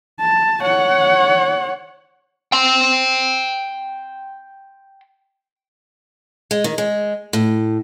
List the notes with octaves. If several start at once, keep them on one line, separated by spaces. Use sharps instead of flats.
A5
C#5 F#5
G5 C6
G#3
D#3
G#3
A2